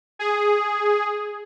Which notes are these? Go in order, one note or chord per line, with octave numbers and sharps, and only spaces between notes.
G#4